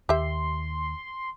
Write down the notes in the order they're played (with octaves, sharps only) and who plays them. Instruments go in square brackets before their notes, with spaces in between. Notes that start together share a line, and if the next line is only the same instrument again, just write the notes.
[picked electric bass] D#2 [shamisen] G4 E5 [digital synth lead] C6